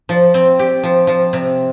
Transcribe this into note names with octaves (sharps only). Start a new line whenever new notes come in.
F3
C4
G4
F3
F3
C3